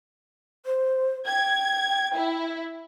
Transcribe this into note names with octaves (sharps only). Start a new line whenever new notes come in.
C5
G5 G#6
E4